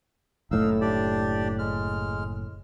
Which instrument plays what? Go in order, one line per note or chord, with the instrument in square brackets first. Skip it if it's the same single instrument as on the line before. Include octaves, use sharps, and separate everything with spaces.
[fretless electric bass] F#1 A2 A3 [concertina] D#4 F5 E6
[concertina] D4 G4 D5
G#3 F6